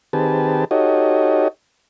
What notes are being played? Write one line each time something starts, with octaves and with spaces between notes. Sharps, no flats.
D#3 C4 G4 G#4 B4 A5
D#4 F#4 G4 A4 C#5 D#5